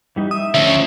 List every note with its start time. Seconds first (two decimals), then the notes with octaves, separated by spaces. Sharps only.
0.16 E3 G3 D#4
0.31 E5 D#6
0.54 D2 F3 C#4 C#5 E5